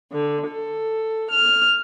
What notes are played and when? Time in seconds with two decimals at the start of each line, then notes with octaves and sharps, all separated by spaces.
0.12 D3
0.47 A4
1.31 F6